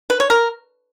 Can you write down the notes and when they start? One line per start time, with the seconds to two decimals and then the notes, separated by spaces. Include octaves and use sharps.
0.10 B4
0.20 C#5
0.30 A#4